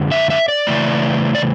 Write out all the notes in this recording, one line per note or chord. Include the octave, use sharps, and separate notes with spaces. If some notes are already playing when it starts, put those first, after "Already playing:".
Already playing: F#2 D3 G#3
E5
E5
D5
C#3 E3 A3
D5